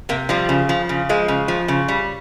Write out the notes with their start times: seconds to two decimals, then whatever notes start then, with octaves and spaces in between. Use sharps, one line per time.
0.09 C3 A#3
0.29 F3 G3
0.49 C#3
0.69 F3
0.89 C#3
1.09 F3 G#3
1.28 C#3
1.48 F3
1.68 C#3
1.88 G3